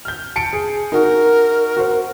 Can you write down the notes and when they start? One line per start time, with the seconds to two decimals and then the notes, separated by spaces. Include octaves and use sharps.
0.05 F6 G6
0.36 A5 C#7 D7
0.53 G#4
0.92 D#4 F#4 A#4
1.77 F#4 C5